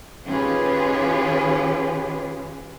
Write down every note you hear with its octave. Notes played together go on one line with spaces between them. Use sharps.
D#3 C#4 F4 G4 G#4 B4